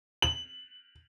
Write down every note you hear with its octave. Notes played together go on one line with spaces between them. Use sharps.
F#7